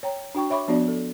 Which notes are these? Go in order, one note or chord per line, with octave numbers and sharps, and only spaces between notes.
C#5 G5 A#5
D4 F#4 G5 C#6
C#5 E5 B5 C#6 D6
F3 B3 D4 F#4 D5
A4